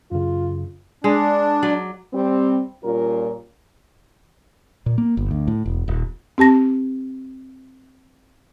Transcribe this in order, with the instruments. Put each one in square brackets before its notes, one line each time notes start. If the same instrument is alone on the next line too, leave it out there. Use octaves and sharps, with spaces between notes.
[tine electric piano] F#2 C#3 [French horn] F4
[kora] G#3 [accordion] D4
[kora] F#3 D5
[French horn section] G3 C4
A#2 G3 C#4 F4 A#4
[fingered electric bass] A#2
A#3
G1
D2
A2
E1
D#1
[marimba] C4 G4 A5 A#6